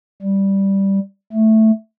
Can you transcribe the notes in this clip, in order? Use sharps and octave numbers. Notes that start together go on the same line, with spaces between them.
G3
A3